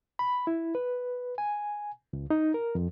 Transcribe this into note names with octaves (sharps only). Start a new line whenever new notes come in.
B5
E4
B4
G#5
C#2
D#4
A#4
F2